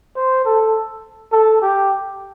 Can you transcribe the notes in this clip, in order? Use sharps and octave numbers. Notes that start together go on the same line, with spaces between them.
C5
A4
A4
G4